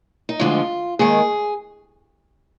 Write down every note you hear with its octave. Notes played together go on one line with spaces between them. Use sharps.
D#4
D2 D3 F3 G#3 F4
D#2 D#3 G#3 G#4